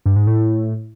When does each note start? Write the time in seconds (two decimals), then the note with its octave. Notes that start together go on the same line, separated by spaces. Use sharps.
0.06 G2
0.16 G#2
0.27 A2